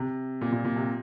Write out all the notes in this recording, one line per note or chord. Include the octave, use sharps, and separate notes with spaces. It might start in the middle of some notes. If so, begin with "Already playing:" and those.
Already playing: C3
A#2
A#2
A#2
C3